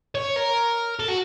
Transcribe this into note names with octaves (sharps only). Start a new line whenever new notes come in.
C#5
A#4
A4
F#4